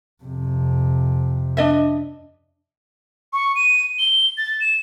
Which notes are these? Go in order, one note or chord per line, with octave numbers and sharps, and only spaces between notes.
F2 C3
D4 D#5 E5
C#6
D#7
G7
A6
E7